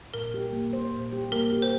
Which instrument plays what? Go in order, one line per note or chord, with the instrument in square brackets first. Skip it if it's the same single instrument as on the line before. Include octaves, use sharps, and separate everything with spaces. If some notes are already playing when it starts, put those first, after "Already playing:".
[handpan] A#2 [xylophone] A#4
[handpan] G4
A#3
C5
A#2
G4
[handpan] A#3 [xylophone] A#4
[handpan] G4
[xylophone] C5